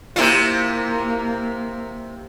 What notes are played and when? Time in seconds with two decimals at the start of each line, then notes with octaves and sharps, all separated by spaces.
0.16 C3 A#3 E4 F4